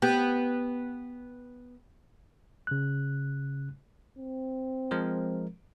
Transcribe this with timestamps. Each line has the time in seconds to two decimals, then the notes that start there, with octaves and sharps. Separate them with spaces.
0.02 B3 G4
2.67 C#3 F#6
4.18 C4
4.91 F3 G#3 A#4